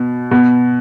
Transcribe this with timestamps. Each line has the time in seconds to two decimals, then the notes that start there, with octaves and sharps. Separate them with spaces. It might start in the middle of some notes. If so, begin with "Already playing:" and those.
Already playing: B2
0.31 B2